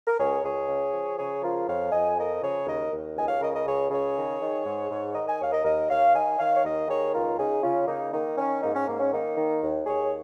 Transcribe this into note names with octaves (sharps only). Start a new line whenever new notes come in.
A#4
C#2 G#4 C#5
C#2 G#4 C#5
C#3
F3
C#3 G#4 C#5
F3 F4 A#4
F2 C#5 F5
F2 D#5 G#5
F3 A#4 D#5
C#3 G#4 C#5
D#2 A#4 D#5
D#2
C#2 D#5 G#5
C#5 F5
C#3 A#4 D#5
A#4 D#5
C#2 G#4 C#5
C#3 G#4 C#5
D#3
D#3
G#2
G#2
D#3 A#4 D#5
D#5 G#5
D#2 C#5 F5
A#4 D#5
D#2 A#4 D#5
D#2 C#5 F5
D#3 D#5 G#5
D#3 C#5 F5
C#5
D#2 A#4 D#5
D#3 G#4 C#5
C#2 F4 A#4
C#3 D#4 G#4
C#3 C#4 F4
C#3 A#3 D#4
D#3 A#3 D#4
D#3 C#4
G#2 A#3 D#4
C#4
G#2 A#3
C#4
D#3 A#3 D#4
D#3
D#2
D#2 G#4 C#5